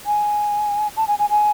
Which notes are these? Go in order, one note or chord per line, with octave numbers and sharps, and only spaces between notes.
G#5
A5
G#5
G#5
G#5